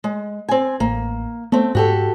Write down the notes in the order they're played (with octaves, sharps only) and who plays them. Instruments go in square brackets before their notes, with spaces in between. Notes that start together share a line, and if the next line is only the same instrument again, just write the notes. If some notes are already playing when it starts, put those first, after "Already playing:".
[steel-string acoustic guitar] G#3
C4 G#5
[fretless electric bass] A1 [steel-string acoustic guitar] A#3
[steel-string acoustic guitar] A3 C4 [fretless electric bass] B3
[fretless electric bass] G#2 [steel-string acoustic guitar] F#4 G4 A4